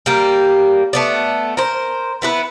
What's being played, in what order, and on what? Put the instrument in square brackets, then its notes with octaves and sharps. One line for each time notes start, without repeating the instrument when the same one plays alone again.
[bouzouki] G3 A#3
A3 B3 D5
A#4 C5
B3 E4 B4